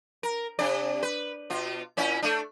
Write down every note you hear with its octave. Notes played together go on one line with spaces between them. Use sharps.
A#4
C3 D4 D5
B4
B2 F4
A#2 C#4 E4
A3 D4